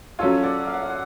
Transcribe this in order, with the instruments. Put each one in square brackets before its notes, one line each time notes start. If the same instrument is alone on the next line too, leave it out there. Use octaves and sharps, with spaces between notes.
[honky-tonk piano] F#3 C#4 F4 [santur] A4 C#5
[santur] D5 F#5
F5
F#5
F5
F#5